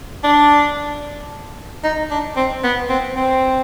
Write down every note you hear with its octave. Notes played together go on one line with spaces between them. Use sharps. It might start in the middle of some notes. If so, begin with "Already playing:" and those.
D4
D#4
D4
C4
B3
C4
C4